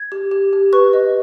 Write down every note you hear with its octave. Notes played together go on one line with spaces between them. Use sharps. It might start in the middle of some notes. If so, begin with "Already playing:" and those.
Already playing: G#6
G4
G4
G4
B4 C#6
D#5